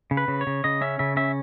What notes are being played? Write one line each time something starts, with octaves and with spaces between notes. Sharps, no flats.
C#3
B4
C#3
C#5
C#3
C#3 D#5
C#4 E5
C#3 E5
C#4 E5